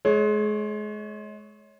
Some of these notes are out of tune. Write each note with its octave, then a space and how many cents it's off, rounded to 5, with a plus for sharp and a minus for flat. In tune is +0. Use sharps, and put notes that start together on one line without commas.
G#3 +30 C#5 +0